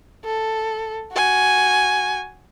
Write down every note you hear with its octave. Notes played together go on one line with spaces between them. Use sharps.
A4
F#4 G#5